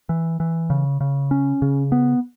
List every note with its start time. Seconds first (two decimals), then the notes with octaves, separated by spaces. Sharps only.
0.09 E3
0.40 E3
0.70 C#3
1.01 C#3
1.31 C#4
1.62 C#3
1.92 B3